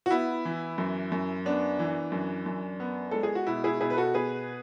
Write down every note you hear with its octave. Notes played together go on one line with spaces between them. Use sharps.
F#4
B3 E4
E3
F#2
F#2
B3 D4
E3
F#2
F#2
B3
G#3 A4
G#4
F#4
B2 E4
E4 G#4
B2 E4 G#4
B4
F#4 A4
B3 G#4 B4